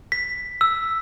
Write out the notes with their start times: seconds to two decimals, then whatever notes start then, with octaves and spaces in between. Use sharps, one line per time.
0.12 B6
0.61 E6